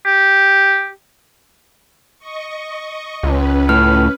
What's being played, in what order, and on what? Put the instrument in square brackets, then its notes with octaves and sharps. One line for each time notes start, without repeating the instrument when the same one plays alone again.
[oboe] G4
[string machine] D#5 C#6
[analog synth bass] C#2 [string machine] C#4 B4
[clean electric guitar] A2 [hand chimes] F6